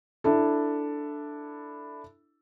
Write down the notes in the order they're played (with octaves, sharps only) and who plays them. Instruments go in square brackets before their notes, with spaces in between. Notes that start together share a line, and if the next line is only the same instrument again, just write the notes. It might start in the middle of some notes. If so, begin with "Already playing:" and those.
[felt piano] D4 E4 A4